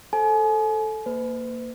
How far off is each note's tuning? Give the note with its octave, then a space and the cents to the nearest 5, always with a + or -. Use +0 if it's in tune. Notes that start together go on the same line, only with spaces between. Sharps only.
A4 +0 C5 +15 G#5 +40
A#3 -10 B4 +45